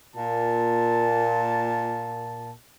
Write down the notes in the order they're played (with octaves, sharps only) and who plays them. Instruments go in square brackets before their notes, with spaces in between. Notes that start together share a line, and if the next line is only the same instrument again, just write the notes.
[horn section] A#2 A5